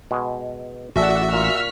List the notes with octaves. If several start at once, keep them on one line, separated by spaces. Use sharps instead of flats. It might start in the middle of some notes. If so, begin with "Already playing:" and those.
B2 G#3
A1 F#4 G#4 A4 D5 E5 F#5 E6
A#2 C#6 F6 B6